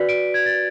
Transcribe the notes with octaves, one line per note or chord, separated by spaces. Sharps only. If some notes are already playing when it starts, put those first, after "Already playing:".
Already playing: F#4 B4 D5 B6
D7
G#6
A6